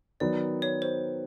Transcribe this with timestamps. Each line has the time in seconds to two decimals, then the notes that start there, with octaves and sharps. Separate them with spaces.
0.20 D#3 F#3 B3 D5
0.62 C#5
0.82 C5